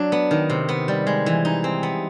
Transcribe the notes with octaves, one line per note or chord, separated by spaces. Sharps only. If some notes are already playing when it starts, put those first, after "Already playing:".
Already playing: F#3 D4
B3
D#3
C3
B3
G3
G#3
E3
D#4
C4
B3